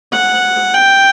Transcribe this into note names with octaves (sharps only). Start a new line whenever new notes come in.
F#5
G5